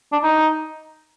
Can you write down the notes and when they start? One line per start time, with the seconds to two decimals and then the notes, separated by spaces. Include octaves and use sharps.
0.13 D4
0.23 D#4